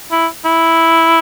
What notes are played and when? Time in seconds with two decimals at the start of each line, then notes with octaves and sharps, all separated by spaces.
0.11 E4
0.45 E4